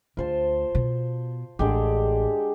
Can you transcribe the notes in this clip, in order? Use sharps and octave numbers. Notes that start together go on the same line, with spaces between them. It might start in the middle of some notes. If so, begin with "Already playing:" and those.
D2 F4 C5 A5
B2
A1 D3 G#3 G4